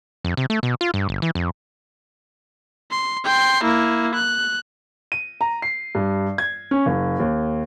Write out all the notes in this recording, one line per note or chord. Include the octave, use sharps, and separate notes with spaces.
F2
C3
A3
B2
F4
G2
G1
E3
F2
C6
G5 C6
A#3 E4
F#6
D#7
A#5
C7
G2
G#6
C#4
F#1
D#2